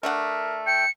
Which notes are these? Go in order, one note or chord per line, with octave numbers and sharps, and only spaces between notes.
A3 D4 A#4 F#5
G5 C#7